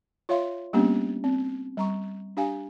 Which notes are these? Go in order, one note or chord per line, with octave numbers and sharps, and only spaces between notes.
F4 C#5 E5 F5 C6
G3 A#3 B3 C#4 D4 G4
C4
G3 A#5 C#6
D4 G4 F5 G#5